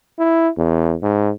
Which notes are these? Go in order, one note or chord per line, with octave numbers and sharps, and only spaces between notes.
E4
E2
G#2